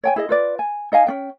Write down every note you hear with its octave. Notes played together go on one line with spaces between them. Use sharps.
C#5 G5 G#5
E4 G#4 D#5
F4 B4 D5
G#5
D#4 D#5 F5 G#5
C#4 D4 G5